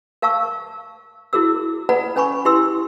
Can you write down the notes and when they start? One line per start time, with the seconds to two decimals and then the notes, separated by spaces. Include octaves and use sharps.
0.22 A#4 F5 A5 C#6 E6
1.33 E4 F#4 G#4 A#4 E6
1.89 A4 B4 D5 F#5 A#5 B5
2.16 C#4 B4 G#5 B5 C#6
2.45 E4 G4 B4 C6 E6